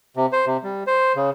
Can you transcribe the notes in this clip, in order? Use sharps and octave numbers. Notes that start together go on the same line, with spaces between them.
C3
C5
C3
G3
C5
C#3